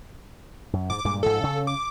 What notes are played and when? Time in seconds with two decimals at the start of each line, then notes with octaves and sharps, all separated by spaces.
0.73 F#2
0.90 G#2 D6
1.05 G2 A#2 G#3
1.23 G#2 F3 A4
1.44 C#3 C#4
1.67 D6